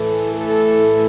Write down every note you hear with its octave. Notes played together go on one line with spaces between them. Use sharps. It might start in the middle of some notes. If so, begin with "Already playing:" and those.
Already playing: A2 E3 A4
A4